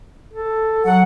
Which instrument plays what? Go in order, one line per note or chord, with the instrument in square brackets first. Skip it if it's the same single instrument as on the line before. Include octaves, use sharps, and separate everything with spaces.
[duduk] A4
[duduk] F#3 [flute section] F#5